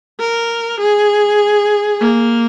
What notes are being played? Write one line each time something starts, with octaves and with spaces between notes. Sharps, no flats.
A#4
G#4
A#3